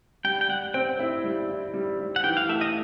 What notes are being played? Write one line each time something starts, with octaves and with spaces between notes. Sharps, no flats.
G3 G5
G5
G3 F#5
C4 G5
E4
G3
E4
G3
G3
F#5
E3 G5
F5
A3 E5
D#5